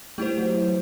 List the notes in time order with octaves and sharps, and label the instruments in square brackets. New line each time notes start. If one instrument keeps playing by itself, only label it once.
[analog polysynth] G3 [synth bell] A3 E4 G4 C5
[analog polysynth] F#3
E3